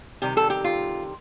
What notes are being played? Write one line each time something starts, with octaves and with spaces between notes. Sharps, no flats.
C3 D#3 G3 G4
A4
G4
F4